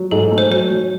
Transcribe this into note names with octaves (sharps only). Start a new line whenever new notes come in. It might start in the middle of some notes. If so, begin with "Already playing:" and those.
Already playing: F#3
G#2 A4
A3
C5
F#3 C5
F#3